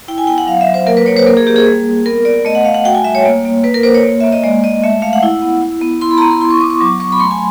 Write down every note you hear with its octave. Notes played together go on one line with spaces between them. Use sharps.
E4 G5
G#5
B3 G5
F#5
F#3 F5
E5
F#3
C5
A#3 A#4
B4
A#3 C#5
C5
A#3 A#4
G#4
A#3 G4
G#4
G3
G3
B3 A#4
B3 D5
A3 D#5
F#5
A3 F5
F#5
F#4 G5
G#5
G3 E5
C#5
A#3
A#3
A#3 B4
A#4
A#3 C5
C#5
A#3
A#3 E5
D#5
G#3 D5
G#3 D#5
A3 E5
A3 F5
F#5
E4
B3
E4
B3
E4 C6
B5
A#5
B3 B5
C6
E4 C6
C#6
B3 D6
C#6
F#3 D6
F#3 C#6
B5
A3 C6
G#5